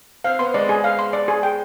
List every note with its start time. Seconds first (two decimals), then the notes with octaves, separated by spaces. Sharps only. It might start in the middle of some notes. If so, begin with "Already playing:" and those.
0.24 C4 F5
0.39 B3 C6
0.54 G#3 D5
0.69 G#4
0.84 F5
0.99 C6
1.13 D5
1.28 G#4
1.43 G5